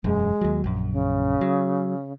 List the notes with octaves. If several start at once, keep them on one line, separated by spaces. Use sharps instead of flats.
E1 F#2 G#3
D#2 F#3
A#1 F#2
C#3
F#3